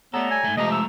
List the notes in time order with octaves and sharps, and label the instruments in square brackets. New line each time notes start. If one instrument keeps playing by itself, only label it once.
[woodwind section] G3 C#5 A#5 [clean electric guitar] A3 A4 [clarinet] B3
[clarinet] G#5
[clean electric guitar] G#2 A3
[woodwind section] F2 C3 F3 [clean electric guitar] G#3 A3 A#5 [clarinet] D#5
[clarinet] E6